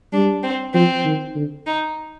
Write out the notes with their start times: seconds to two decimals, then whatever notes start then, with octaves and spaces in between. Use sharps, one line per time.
0.13 G3 D4
0.43 C4
0.74 F3 C4
1.05 D#3
1.35 D3
1.67 D#4